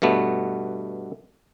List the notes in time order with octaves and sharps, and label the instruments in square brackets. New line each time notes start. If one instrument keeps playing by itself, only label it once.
[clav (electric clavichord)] G2 B2 A3 B3